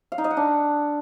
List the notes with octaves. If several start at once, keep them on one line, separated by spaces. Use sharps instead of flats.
F5
D#4
D#5
F#5
D4